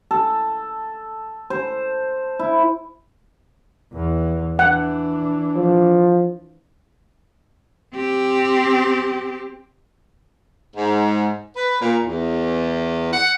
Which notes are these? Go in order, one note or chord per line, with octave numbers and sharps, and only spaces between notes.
A4
C5
E4
E2 E3
E3 D4 F#5
F3
C4 G4
G#2
B4
A#2
E2
F#5